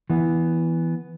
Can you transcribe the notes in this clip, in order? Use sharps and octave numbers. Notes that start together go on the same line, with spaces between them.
E3 B3